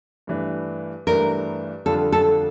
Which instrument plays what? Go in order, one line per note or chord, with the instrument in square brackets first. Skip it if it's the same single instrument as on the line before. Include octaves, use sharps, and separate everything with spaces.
[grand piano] G2 E3 A3 D4
[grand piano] G2 E3 A3 D4 [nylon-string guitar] A#4
[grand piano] F2 D3 G3 D4 F4 [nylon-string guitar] A4
[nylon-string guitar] A4